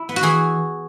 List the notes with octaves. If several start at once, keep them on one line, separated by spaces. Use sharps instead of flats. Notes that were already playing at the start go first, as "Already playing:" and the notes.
Already playing: E4
B3
F#4
E3 G#4